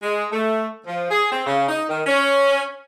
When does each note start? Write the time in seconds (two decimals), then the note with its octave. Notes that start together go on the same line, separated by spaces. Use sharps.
0.03 G#3
0.32 A3
0.86 F3
1.11 G#4
1.30 C4
1.46 C#3
1.68 D#4
1.88 D#3
2.06 C#4